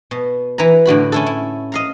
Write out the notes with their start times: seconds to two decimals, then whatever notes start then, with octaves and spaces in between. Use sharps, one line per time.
0.11 B2
0.58 E3 B4 A#5
0.86 A2 D3 F#4 B5
1.12 C#4 E4 A4
1.26 E4
1.72 D#5 F5 A#5